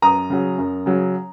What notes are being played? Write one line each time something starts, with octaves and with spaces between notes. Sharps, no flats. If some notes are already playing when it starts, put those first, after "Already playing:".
F#2 A#5 D#6
C#3 F#3
F#2
C#3 F#3